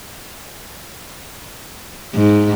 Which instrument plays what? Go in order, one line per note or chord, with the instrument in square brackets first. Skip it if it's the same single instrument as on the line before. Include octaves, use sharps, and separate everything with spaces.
[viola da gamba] G#2